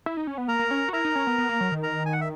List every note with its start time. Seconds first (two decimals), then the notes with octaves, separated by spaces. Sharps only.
0.06 E4
0.17 D#4
0.27 C#4
0.38 B3
0.48 A#3 A#4 A#5
0.59 A#3
0.71 C#4
0.89 F#4
0.93 E4 A#4 A#5
1.04 D#4
1.15 C#4
1.27 B3
1.38 B3
1.49 A#3
1.61 F#3
1.72 D#3
1.83 A#4 A#5
2.06 G#5
2.13 F#5
2.21 E5